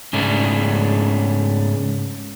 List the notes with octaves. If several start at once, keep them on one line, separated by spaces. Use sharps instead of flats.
G#2 C#3 A3 D4